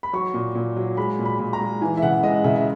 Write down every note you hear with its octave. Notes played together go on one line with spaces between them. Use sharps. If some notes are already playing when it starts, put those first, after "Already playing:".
B5
F#3 C#6
A#2
A#2
F#3
G#3 B5
A#2
B5
A#2
A#5
G#3
E3 G#5
E5
C#3 F#5
G#3 D#5
C#3 E5
E5